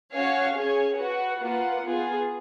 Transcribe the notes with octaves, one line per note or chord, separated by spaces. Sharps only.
C#4 F#4 C#5 F5 G#5
C#4 G#4 C#5 G#5
F#4 B4 F#5
A#3 F4 B4 F#5
B3 F4 G#4